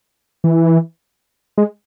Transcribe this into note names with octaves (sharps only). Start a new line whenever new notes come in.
E3
G#3